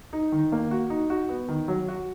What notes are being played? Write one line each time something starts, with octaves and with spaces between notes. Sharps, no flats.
D#4
D#3
A#3
F#4
D#4
F#4
B3
D#3
F#3
F#4